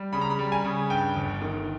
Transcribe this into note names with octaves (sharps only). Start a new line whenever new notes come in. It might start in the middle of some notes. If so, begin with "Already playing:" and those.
Already playing: G3
C#3 B5
A#5
B5
G3
G#5
C#3
G2 G5
G1
D#3